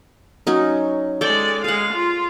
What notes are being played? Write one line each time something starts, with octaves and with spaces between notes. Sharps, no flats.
F#3 C#4 D#4
G#3 A4 D5 G5
G#3 G#4 F5 F#5
F4